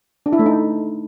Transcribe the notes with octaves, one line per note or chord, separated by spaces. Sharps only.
D4
E4
A3
D#4